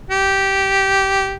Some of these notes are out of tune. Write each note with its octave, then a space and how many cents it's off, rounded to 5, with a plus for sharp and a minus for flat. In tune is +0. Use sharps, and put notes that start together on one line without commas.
G4 -10